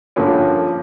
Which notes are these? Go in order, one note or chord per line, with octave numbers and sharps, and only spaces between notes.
G2 A#2 D3 F3 A#3 C#4